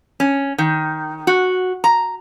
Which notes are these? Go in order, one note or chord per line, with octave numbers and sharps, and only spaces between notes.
C#4
D#3
F#4
A#5